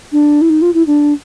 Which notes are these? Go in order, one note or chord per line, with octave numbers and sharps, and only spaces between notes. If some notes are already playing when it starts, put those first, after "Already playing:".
D4
E4
D#4
F4
E4
D4